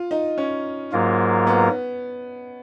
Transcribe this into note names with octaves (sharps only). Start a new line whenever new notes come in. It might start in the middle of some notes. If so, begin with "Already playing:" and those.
Already playing: F4
D#4
C#4
G#2 F#3 A#3 F4 A#4
B3